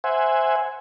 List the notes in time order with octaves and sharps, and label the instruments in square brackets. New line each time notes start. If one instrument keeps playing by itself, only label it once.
[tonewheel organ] C5 E5 F#5 G#5